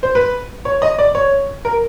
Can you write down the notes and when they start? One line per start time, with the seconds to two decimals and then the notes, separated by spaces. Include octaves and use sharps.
0.03 C5
0.15 B4
0.65 C#5
0.82 D#5
0.98 D5
1.15 C#5
1.65 A#4